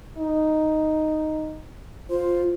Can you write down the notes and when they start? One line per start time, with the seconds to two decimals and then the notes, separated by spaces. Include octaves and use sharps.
0.17 D#4
2.10 F4 C5